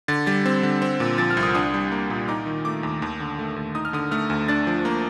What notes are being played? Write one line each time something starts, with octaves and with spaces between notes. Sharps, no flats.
D3 A6
G3 A6
C4
D3
C4
A#2
F3 A6
F6
C2
D#6
D4 D#6
G3
A#3
A#2
D#4 D6
D#3
A3 D6
D#2
D#2
D3
A3
D#2
D#4 D#6
F6
D3 D#6
A3 F6
D2
D4 A6
F3
A#3